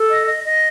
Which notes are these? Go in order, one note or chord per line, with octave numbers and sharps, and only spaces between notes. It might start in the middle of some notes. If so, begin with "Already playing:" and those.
Already playing: A4
D#5
D#5
D#5